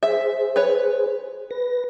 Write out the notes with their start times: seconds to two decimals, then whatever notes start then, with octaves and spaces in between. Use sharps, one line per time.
0.03 G#4 C5 E5
0.56 B4 C#5
1.51 B4 A#6